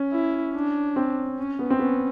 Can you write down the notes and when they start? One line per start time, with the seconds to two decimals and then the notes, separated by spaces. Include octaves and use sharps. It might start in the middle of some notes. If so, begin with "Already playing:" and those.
Already playing: C#4
0.12 E4
0.54 D4
0.96 C4
1.38 C#4
1.59 B3
1.70 C4
1.79 B3 C#4